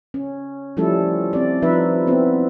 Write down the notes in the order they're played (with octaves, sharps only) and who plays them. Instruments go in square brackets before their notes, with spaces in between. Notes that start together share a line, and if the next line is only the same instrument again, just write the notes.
[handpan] C#4
F3 G3 A3 C#4 E4 A4
C4 D5
F3 D#4 B4 E5
B3 C4 E4